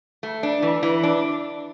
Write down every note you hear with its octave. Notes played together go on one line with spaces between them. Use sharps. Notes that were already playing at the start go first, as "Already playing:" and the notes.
A3
D4
E3
E3
D4